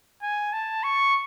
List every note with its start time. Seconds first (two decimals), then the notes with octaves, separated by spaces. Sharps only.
0.22 G#5
0.53 A5
0.83 C#6